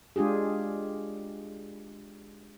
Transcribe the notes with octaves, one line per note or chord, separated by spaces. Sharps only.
G#3 D4 F4 G4 G#4